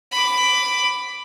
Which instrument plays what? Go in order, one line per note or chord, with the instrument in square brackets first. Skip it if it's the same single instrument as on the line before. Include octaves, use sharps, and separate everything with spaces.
[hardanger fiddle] B5 D6